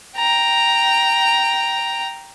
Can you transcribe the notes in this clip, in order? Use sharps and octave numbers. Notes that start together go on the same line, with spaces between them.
G5 A#5